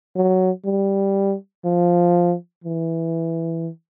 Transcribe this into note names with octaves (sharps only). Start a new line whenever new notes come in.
F#3
G3
F3
E3